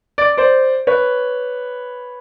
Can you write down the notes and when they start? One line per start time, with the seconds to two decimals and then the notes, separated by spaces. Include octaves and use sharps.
0.18 D5
0.37 C5 D5
0.87 B4 C#5